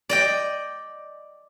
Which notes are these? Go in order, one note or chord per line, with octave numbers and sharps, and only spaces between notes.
D5 D#5 G5